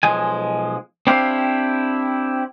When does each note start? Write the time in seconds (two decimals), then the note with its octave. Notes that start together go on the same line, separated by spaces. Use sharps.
0.03 B1 F3 G#3 G#5
1.07 C4 D4 E4 G4 C5 F5